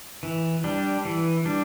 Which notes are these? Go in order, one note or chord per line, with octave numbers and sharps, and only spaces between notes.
E3
G3 D4
E3
G3 D4